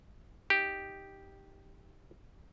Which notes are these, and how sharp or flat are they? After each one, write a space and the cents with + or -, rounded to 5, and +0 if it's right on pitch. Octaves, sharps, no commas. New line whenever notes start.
D#4 +0 G4 +0